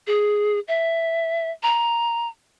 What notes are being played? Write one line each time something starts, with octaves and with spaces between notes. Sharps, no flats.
G#4
E5
A#5